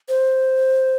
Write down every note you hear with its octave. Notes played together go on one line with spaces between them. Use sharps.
C5